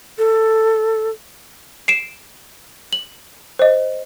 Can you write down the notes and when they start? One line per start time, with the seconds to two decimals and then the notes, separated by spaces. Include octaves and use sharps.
0.18 A4
1.88 C7 D7 E7
2.93 F#7
3.59 C5 D#5